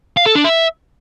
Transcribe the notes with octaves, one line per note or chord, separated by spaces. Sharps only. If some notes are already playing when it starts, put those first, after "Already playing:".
F5
A4
D4
E5